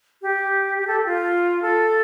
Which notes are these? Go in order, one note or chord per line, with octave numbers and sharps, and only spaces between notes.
G4
G4
A4
F4
A4